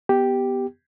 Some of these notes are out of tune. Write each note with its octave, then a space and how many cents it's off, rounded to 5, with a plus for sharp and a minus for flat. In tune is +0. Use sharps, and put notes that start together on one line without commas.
B3 +0 G4 +0